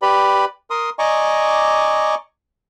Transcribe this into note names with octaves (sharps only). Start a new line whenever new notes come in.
G4 B4 D5 B5
A#4 C6 D#6
D5 D#5 G#5 A#5 C#6 D6